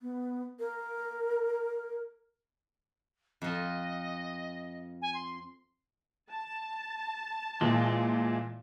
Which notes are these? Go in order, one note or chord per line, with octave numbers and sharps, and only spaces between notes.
B3
A#4
F2 F3 D#5
G#5
C6
A5
A#2 E3 G#3